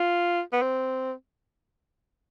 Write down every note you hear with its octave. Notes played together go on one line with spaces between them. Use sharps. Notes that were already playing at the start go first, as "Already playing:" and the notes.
Already playing: F4
B3
C4